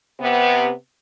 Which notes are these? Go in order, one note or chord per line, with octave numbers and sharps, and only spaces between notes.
C3 B3